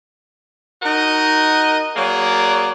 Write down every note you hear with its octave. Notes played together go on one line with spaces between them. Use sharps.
D#4 F#4 A#4 D#5
F#3 A#3 G#4 D5